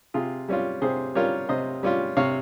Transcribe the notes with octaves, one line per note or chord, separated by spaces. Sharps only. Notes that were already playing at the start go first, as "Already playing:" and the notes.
C3 F4 G#4
G3 C#4 F4
C3 G#4 C5
G3 C#4 F4 A#4 C#5
C3 C5 D#5
G3 C#4 F4
C3 C#5 F5